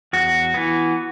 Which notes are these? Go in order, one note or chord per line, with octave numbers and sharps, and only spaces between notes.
E2 F#4
E3 B3